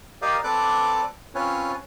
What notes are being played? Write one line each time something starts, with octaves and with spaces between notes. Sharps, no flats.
G4 A#4 D5 D#5 F5
C4 A4 B4 D5 D6 F#6
C4 C#4 F4 B4 C#5